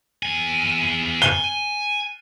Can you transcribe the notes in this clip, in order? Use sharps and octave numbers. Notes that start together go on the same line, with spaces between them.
E2 G#5
G#5 G7